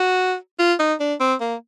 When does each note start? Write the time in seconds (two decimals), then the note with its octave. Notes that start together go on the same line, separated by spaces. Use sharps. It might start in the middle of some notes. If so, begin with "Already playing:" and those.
Already playing: F#4
0.59 F4
0.80 D#4
1.00 D4
1.20 C4
1.41 A#3